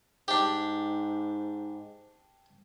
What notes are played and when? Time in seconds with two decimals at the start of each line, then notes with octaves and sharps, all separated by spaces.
0.28 G#2 D4 G4